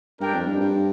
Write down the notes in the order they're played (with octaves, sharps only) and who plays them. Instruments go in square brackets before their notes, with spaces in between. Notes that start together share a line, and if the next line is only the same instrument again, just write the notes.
[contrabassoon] G2 [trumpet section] D4 A#4 G5
[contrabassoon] F2
G2
G2